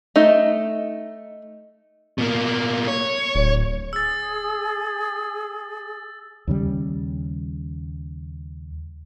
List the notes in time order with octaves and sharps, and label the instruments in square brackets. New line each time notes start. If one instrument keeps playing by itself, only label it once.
[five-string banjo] A3 D#4
[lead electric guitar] B2 A#3
C#5
[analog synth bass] D1
[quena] G#4 [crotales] E6 A6
[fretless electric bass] D#2 C#3 G3